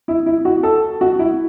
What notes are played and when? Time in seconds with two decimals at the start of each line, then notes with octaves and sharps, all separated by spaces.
0.08 E4
0.26 E4
0.45 F#4
0.63 A4
1.01 F#4
1.19 E4